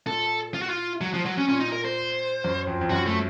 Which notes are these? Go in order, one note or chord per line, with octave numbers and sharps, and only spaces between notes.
A#2 A4
F4
F#4
F4
F#3
F3
F#3
C#4
A#2 C#4
D#4
A#4
C5
F#2
F2
F2
F#2 F#4
A3